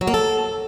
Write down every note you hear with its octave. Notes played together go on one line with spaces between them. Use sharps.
F#3
A#3
A4